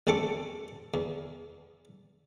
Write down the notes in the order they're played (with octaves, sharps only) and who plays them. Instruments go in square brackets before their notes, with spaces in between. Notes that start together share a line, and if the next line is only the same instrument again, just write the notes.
[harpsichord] A1 E2 C4 A4 C#6 D6
E2